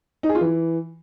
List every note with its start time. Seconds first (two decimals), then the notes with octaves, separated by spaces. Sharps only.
0.23 D#4
0.29 G#4
0.35 F4
0.41 E3